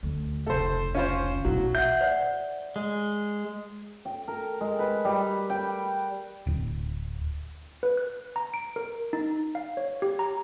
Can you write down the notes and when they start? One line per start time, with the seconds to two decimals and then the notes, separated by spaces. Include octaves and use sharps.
0.03 D2 C#4
0.47 F1 C#2 A4 C5
0.95 C#4 F4 C5
1.45 B1 F#3 E4
1.75 E5 F#5 G6
2.01 C5 D5 F#5
2.76 G#3
4.05 G5
4.28 A#4
4.61 G#3
4.79 B4
5.05 G3
5.50 G5
6.47 D1
7.83 B4
7.97 F#6
8.36 A#5
8.54 D7
8.76 A#4
9.13 D#4
9.55 F5
9.77 C#5
10.02 G4
10.19 A#5